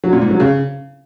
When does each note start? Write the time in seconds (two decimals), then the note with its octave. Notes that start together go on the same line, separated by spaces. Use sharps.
0.04 F#3
0.13 A#2
0.22 G#2
0.31 F#3
0.40 C#3